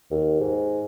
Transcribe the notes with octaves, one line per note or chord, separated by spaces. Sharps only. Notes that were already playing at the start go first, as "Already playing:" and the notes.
D#2
G#2